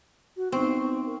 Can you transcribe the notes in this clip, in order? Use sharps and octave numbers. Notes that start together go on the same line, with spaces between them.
F#4
B3 C4 D#4 C#6
A#4